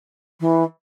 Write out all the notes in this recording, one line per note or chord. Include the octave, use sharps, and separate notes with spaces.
E3